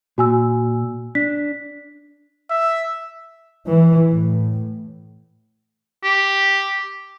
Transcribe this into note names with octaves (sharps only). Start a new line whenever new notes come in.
A#2 F#4 G#5 E6
D4 B6
E5
E3
A2
G4